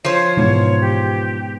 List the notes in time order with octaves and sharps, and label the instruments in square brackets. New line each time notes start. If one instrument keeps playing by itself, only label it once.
[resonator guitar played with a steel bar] F3 C5 [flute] C#5
[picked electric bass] G#2 B2 E3 [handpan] G#3 B3 D#4 [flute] C#5
[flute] G4